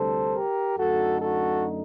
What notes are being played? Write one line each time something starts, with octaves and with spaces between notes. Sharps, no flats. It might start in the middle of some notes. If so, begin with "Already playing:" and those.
Already playing: D2 C3 G3 A4 C5
G4 A#4
F#2 D3 A3 D#4 F#4 A4
F#4 A4